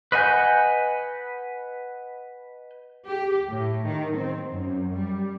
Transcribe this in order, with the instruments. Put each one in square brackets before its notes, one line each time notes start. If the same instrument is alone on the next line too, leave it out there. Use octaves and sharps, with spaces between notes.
[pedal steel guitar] B4 D#5 F#5 G#5 G6
[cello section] G4
A2
D#3
C4
F#2
G3